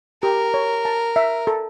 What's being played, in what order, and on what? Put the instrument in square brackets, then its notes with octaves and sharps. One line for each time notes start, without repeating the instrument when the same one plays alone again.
[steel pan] G4 [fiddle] A#4
[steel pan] C#5
A5
E5
A4